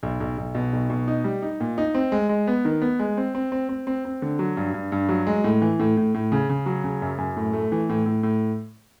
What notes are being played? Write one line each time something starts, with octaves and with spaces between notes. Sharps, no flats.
B1
B1
B1
B2
B1
B2
D#4
G3
D#4
A#2
D#4
C4
G#3
G#3
B3
D#3
B3
G#3
C4
C4
C4
C4
C4
C4
D3
F#3
G2
G2
G2
F#3
G#3
A2
E3
A2
A2
A2
C#3
C#3
F#3
C#3
F#2
F#2
A2
A3
E3
A2
A2
A2